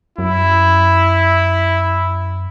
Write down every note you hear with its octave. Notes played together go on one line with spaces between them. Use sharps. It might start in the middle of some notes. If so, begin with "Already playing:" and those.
F#2 E4